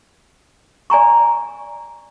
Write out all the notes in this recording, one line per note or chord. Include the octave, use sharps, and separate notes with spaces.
D5 G#5 A#5 C#6